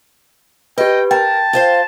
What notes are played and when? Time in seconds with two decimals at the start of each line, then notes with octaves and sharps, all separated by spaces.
0.78 G4 B4 D#5 G5
1.11 A#4 G5 A5
1.53 F4 C5 F5